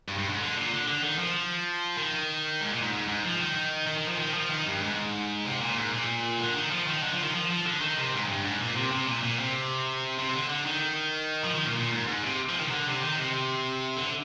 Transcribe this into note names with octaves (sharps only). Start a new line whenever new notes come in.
G2
G2
G#2
D3
A#2
D3
D3
D#3
F3
D#3
G#2
A#2
G#2
G#2
G#2
F3
D#3
D#3
D#3
F3
D#3
F3
D#3
G2
G#2
C3
A#2
G#2
A#2
D3
D#3
F3
D#3
D3
F3
D#3
F3
F3
D3
D#3
C3
G#2
G2
G#2
A#2
C3
C3
A#2
A#2
C3
C3
D3
D3
D#3
F3
D#3
A#2
A#2
G#2
G#2
C3
F3
D#3
C3
D3
C3
D#3
C3
D3